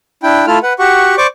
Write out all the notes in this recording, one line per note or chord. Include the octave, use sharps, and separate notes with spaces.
D4 E4 G5
A3 E4 F4 A4 F6
B4 F#5
F#4 G4 F#5 C#6
C5 D5 C#6 D6